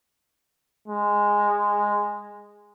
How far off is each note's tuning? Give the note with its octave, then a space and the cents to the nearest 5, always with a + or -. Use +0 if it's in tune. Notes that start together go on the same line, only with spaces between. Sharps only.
G#3 -10